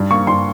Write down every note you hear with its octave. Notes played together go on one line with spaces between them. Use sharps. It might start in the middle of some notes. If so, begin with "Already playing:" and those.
Already playing: G2
A#3 C#6
G2 C6